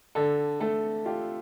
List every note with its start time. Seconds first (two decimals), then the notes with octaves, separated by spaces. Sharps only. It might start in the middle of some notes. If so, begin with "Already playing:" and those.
0.15 D3 A4
0.60 A3 A4
1.06 F4 G4